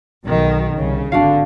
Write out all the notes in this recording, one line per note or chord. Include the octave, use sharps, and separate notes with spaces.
B1 B2 D#3
C2 C#3
G#1 D3 D4 F#4 F5